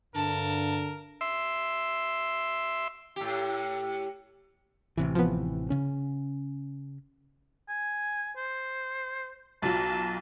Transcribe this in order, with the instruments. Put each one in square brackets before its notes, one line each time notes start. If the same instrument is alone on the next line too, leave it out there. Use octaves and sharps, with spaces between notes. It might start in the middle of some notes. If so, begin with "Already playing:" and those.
[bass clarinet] G2 [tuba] D3 [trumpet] A#4 [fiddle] A5
[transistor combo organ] E5 C6
[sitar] A2 G4
[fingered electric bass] A1 C3 E3
[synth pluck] F3 B3
[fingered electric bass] C#3 C#4
[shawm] G#5
C5
[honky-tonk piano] B1 F#3 F4 [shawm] A5